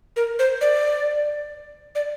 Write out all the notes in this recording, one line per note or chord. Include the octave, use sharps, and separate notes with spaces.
A#4
C5
D5
D5